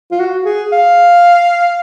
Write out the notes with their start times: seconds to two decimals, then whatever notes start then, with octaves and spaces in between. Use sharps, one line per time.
0.12 F4
0.20 F#4
0.45 G#4
0.72 F5